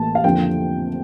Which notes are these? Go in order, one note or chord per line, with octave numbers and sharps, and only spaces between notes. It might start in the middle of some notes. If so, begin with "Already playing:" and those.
Already playing: A1 A2 E3 A#3 A5
F5
F2 D3 F3 A#3 G5